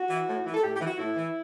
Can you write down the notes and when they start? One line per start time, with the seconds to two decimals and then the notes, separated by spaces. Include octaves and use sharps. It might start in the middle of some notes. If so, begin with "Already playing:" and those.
Already playing: F#4
0.09 E3
0.28 A2
0.45 E3
0.54 A4
0.63 A2 G4
0.75 G4
0.81 E3
0.86 F#4
0.98 A2 E4
1.16 E3